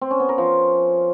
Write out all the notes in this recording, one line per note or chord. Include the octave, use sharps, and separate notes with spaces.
C4
C#4
B3
A#4
F3